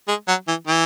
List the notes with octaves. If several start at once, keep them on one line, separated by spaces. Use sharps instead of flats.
G#3
F#3
E3
E3